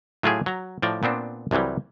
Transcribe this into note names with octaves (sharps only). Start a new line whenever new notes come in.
A2 F#3 A3 F4 G4 G#4
F#3 A#5
A2 F3 D5 A#5
A#2 B3 C4 D4
C2 C3 E3 F#3 G3